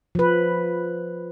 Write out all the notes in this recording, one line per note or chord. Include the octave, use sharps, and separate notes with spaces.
F3 B4